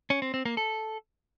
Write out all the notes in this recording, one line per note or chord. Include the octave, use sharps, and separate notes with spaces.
C#4
C4
C4
A#3
A4